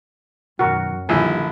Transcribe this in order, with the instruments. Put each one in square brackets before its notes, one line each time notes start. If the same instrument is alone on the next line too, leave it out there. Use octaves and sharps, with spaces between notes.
[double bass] F#2 [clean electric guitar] B2 D#3 F#3 [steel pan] F#4 A#4
[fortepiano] A#1 E4 [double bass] D3 [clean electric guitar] D#3 G3 [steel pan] G#5